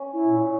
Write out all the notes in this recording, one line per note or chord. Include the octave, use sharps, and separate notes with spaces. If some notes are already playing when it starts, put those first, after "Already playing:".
Already playing: C#4
E4
A#2